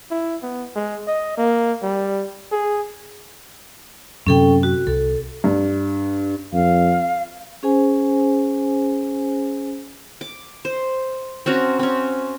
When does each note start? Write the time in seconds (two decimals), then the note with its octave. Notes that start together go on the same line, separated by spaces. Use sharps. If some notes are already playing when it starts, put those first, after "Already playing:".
0.11 E4
0.43 B3
0.76 G#3
1.07 D#5
1.37 A#3
1.83 G3
2.52 G#4
4.27 F#2 C3 C#4 A4 G5
4.63 F#4
4.87 C2 A4
5.44 G2
6.53 F2 F5
7.63 C#4 G#4 C5 G#5
10.21 D6
10.65 C5
11.46 C4 C#4 F#4 A#5
11.79 C4 C#4